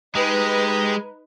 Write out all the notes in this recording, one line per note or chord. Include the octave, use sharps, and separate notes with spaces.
G#3 D#4 G4 B4 D#5 A#5